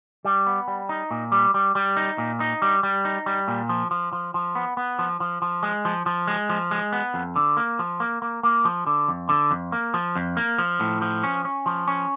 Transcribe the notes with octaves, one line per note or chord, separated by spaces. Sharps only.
G3
B3
G3
D#4
A#2
G3
G3
G3
D#4
A#2
D#4
G3
G3
D#4
G3
A#2
F3
F3
F3
F3
B3
B3
F3
F3
F3
G#3
F3
F3
G#3
F3
G#3
B3
F2
D3
A#3
F3
A#3
A#3
A#3
F3
D3
F2
D3
F2
A#3
F3
F2
A#3
F3
A2
F3
C#4
C#4
F3
C#4